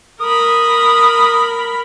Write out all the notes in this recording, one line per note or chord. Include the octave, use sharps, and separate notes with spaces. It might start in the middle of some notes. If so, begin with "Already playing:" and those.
A#4 B5 D#6